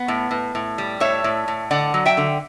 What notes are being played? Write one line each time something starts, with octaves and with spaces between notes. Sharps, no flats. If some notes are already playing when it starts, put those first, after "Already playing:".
Already playing: B3
A2
A2
A2
G3
A2 C#5 E5
A2
A2
D3 D5 F#5
F#3
E5 G5
D3